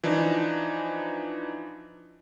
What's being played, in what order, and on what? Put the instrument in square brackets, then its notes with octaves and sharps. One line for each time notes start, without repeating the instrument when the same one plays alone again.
[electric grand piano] E3 F3 D4 D#4